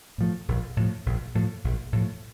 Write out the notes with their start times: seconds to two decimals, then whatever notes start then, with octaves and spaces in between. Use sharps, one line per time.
0.18 A2 F3 A3
0.48 A#1
0.77 A2 F3 A3
1.06 A#1
1.35 A2 F3 A3
1.64 A#1
1.92 A2 F3 A3